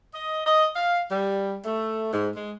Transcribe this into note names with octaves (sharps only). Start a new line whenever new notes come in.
D#5
D#5
F5
G3
A3
G#2
G#3